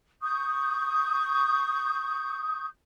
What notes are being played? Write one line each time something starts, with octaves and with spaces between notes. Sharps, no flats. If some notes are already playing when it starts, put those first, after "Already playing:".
C#6 D#6 G6